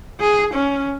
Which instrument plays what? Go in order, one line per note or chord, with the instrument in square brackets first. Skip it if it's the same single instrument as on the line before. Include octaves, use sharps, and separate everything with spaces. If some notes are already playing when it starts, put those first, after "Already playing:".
[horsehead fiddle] G#4
C#4